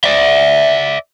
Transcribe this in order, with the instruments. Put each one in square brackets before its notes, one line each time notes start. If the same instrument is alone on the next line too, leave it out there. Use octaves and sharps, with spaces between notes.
[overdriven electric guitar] D5 E5